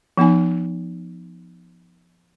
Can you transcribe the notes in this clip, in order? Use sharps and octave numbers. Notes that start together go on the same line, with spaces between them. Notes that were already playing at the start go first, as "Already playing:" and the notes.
F3 B3 D#4 G#5